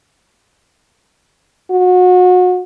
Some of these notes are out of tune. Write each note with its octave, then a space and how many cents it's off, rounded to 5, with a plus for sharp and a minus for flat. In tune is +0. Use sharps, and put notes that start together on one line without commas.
F#4 -30